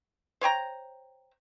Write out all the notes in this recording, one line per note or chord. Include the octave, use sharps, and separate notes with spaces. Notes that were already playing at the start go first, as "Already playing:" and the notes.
C5 C#5 G5 A#5